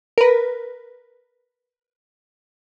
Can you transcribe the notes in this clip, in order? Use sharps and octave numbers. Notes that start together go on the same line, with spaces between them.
A#4 B4